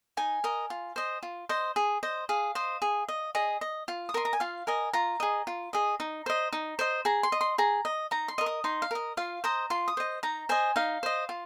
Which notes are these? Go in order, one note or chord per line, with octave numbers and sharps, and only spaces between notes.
D#4 G#5
A#4 D#5
F4
C5 D#5
F4
C5 D#5
G#4
C5 D#5
G#4 F5
C5 D#5
G#4
D#5
G#4 D#5
D#5
F4
D#6
A#4 D#5 C6
A#5
G#5
F4 F5
A#4 D#5 G#5
F4 A#5
G#4 D#5
F4
G#4 D#5
D#4
C5 D#5
D#4
C5 D#5
G#4 A#5
C6
D#5
C6
G#4 A#5
D#5
D#4 A#5
C6
A#4 D#5
D#6
D#4 C6
F5
A#4 D#5
F4 F5
C5 D#5 A#5
F4 C6
D#6
C5 D#5
D#4 A#5
C5 D#5 G#5
D#4 F5
C5 D#5
F4